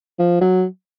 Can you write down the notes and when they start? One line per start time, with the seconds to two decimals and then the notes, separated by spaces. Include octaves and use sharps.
0.19 F3
0.41 F#3